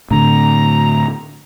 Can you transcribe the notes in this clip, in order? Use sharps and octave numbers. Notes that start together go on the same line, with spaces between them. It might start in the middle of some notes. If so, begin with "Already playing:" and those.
A2 D3 A#5